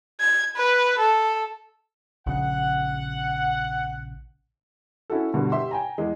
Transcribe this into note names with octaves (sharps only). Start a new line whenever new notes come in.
G#6
B4
A4
A#1 C#3 F#5
C#4 E4 F#4 A4
G2 B2 D3 G3
G4 E5 C6
G5 G#5 A#5
E2 G#3